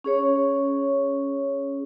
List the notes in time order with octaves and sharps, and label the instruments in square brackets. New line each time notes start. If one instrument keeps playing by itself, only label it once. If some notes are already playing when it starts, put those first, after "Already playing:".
[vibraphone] C#4 G#4 C#5